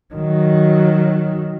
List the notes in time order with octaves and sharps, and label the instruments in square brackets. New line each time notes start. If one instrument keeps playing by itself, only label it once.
[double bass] D#3 F#3